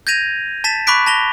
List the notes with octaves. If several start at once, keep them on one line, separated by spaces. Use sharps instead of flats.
G6 G#6 A#6 D#7 F7
A5 A6 B6 E7
B5 C#6 D6 F#6 B6 D7
A5 A#6 F7 G7